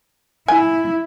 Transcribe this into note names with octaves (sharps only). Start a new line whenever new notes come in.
E4 G#5